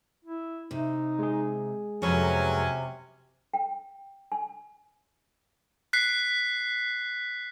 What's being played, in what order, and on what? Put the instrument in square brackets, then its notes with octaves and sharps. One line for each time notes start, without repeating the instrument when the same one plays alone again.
[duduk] E4
[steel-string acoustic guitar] C3 [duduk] D#4
[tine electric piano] G#3 G#4
[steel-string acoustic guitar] F2 B4 A#5 [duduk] C3 [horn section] F#3 C#4
[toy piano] G5
G#5
[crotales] F#6 B6 C7